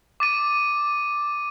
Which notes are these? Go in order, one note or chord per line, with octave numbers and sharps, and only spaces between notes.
D6 A6 D#7